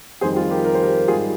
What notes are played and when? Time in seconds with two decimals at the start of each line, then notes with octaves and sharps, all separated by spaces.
0.21 F2 D#3 G3 G#4 C5
0.36 F4 G#4
0.51 G4 A#4
0.65 A#4
0.75 C5
0.83 G4 A#4
1.08 G#2 G3 F4 G#4